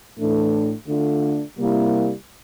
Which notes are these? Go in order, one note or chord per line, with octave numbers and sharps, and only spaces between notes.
A2 E3 A3 D4
D3 A3 D4 F4
C3 G3 A#3 E4